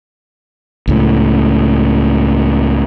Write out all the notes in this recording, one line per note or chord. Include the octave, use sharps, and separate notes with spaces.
C#2 A2